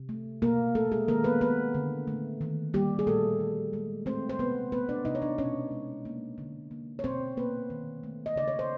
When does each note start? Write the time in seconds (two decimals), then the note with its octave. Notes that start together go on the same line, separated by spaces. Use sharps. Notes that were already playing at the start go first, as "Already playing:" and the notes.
Already playing: C3
0.09 A3
0.42 B2 A#3 A#4
0.75 A3 A#3 A4
0.92 G#3 G#4
1.08 D#3 A#3 A#4
1.24 B3 B4
1.41 A#3 B3 B4
1.75 D3
2.08 A3
2.41 D#3
2.74 G3 A#3 G4
2.99 G#4
3.07 A#2 A3 A4
3.40 D#3
3.73 G#3
4.06 A3 C4 C5
4.29 C5
4.39 C3 B3 B4
4.72 A3 B3 B4
4.89 D4 D5
5.05 C3 D#4 D#5
5.15 C#5
5.22 D4 D5
5.38 B2 C#4 C#5
5.71 G#3
6.05 A#3
6.38 D3
6.71 A#3
6.99 C#5
7.04 B2 C4 C5
7.37 A#3 B3 B4
7.70 D#3
8.03 A3
8.26 D#5
8.36 C#3 D5
8.48 C#5
8.59 C5